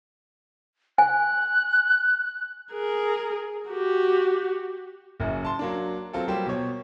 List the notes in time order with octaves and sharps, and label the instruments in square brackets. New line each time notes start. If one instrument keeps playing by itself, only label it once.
[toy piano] G#5 [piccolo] F#6
[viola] G#4 A#4
F#4 G4
[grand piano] F#1 F#2
A5 C6
F#3 A#3 D4
F#3 C4 F4 A4
F#3 G3 A#3 G4 C5
B2 C#5